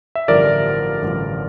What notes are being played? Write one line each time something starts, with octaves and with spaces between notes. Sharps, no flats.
E5
A1 G2 D3 F3 A#4 D5
A1 G2 D3 F3